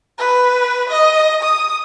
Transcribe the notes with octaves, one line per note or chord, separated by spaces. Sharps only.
B4
D#5
D#6